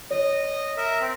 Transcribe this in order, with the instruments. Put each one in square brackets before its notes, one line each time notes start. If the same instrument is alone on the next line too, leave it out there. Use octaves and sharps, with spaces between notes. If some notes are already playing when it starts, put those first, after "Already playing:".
[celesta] C#5 [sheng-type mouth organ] D#5
[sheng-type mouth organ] A#4 E5
C4